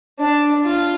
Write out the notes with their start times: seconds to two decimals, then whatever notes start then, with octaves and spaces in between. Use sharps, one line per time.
0.20 D4
0.65 F4